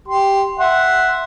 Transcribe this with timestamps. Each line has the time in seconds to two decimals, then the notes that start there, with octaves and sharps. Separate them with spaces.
0.08 G4 C6
0.59 E5 F#5 C6